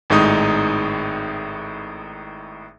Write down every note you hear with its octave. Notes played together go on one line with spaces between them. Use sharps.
G#1 A2 G#3 D#4 D#6